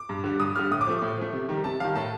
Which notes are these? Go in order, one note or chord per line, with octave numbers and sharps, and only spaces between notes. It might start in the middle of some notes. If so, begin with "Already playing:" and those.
Already playing: D6
G2
D3 G3
G2 D#6
D3 G3 F6
A2 D#6
D6
F3 A3
A2
F3 A3
C3
D#3 G3
C3 A5
D#3 G3 F5
A2 A5